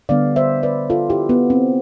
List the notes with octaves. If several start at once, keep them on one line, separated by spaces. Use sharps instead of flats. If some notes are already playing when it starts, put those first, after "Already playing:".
D3 G3 B3 D5 F5
C5 E5
B4 D5
F4 A4
E4 G4
B3
C4